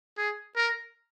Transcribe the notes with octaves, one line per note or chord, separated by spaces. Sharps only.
G#4
A#4